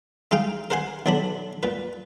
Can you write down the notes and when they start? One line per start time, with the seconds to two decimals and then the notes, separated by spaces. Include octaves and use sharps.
0.31 G#3 D#4 F5 G5
0.70 A#4 C5 F#5 G#5 C6
1.06 B1 D3 F#3 D4 B5
1.63 A#2 B4